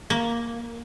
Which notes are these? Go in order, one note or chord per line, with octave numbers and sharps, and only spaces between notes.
A#3